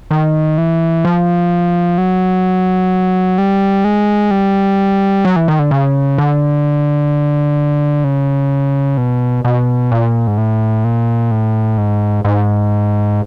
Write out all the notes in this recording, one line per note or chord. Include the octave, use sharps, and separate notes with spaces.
D#3
E3
F3
F#3
G3
G#3
G3
F#3
E3
D#3
D3
C#3
D3
C#3
B2
B2
A#2
G#2
A2
A#2
A2
G#2
G#2